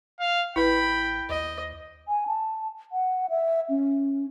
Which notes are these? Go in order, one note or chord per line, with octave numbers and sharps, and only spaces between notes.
F5
A1 E4 B4 G5 B5
D#2 D#5
G#5
A5
F#5
E5
C#4